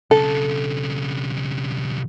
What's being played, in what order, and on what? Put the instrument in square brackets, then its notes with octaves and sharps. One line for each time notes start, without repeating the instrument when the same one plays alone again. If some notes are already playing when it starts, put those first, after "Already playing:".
[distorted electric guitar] B1 C#3 [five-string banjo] A4